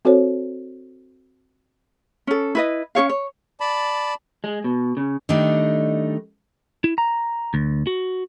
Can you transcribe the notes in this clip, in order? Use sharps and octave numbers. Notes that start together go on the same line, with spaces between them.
C4 F#4 A4 C5 C#5
C#4 A4
E4 B4 D#5
C#4 G#4 C#5 F5
C#5
D5 A5 B5
G#3
B2
C#3
D#3 G3 A3 D4 D#4
E4
A#5
D2
F#4